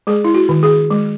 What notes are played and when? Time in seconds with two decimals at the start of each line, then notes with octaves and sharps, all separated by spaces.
0.07 G#3 G#4
0.25 E4
0.34 F#4
0.49 D#3
0.63 G#4
0.90 G#3